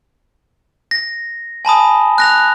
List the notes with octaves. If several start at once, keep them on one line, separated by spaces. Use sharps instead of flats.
A#6
G#5 A5 B5 D#6
F#6 A#6 F7